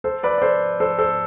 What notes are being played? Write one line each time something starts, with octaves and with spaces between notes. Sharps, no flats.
A4 C5
B4 D5
D5
A4 C5
A4 C5
A4 C5